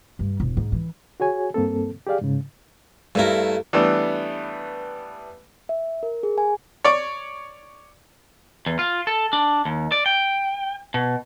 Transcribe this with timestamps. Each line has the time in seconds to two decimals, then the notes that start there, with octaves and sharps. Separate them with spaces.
0.19 G2
0.40 E1
0.57 G#2
0.72 E3
1.20 F#4 G#4 C#5 G#5
1.54 G2 A#3 C4 A4
2.07 G4 G#4 D5 F5
2.21 G#2 C#3
3.15 G2 A3 A#3 E4 A#4
3.73 E3 G3 A3 B3 D4
5.69 E5
6.03 A#4
6.23 G#4
6.38 G#5
6.85 C#5 D5
8.66 E2
8.79 F4
9.07 A4
9.33 D4
9.65 D#2
9.92 D5
10.06 G5
10.94 B2